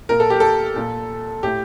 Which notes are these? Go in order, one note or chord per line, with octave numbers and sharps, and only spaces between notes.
A#2 A#4
A4
G4
A4
A#2
A2 G4